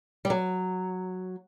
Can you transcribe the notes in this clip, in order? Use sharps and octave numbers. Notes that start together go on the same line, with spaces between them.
G3
F#3